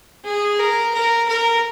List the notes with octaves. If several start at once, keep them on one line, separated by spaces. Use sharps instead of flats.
G#4
A#4
A#4
A#4